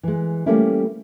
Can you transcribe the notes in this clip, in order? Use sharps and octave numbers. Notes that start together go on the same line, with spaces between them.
E3 G#3
G3 A3 A#3 C#4 E4